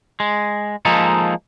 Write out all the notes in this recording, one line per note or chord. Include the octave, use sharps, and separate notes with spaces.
G#3
F3 G#3 A#3 D#4 A4